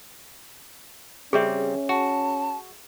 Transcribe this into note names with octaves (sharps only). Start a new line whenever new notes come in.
C#3 G3 C4 C#4 G#4 E5
F#4 A5